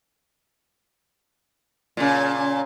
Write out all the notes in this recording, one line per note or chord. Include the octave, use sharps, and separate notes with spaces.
A#2 C#3